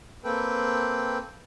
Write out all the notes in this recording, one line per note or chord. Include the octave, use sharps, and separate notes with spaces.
A#3 C4 A4 B4 G5